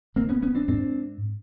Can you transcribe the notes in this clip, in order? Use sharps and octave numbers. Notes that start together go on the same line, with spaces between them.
G#2 A#3 C4
B3 C#4
B3 C#4
C4 D4
G#2 C4 D4